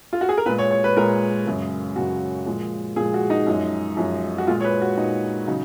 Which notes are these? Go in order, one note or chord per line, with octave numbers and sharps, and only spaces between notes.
F4
F#4
G#4
A#4
A#2 G#3 B4
C#5
C#5
B4
A#2 G#3 A#4
F#2 C#3 G#3
F#2 C#3 G#3 F#4
A#2 F3 G#3
A#2 F3 G#3 G#4
F#4
D#4
F#2 F3 G#3
F#2 F3 G#3
F#4
A#2 G#3 F4
C#5
B4
F#4
A#2 G#3 D#4
C#3 F#3 D#4